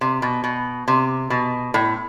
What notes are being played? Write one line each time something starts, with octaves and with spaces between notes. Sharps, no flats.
C3
B2
B2
C3
B2
A2